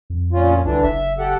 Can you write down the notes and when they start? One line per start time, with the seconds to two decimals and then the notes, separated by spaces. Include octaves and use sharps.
0.10 F2
0.32 A#2 C#4 F4
0.65 C2 D3 E3 D4
0.84 F#1 E5
1.19 G4 A4 F#5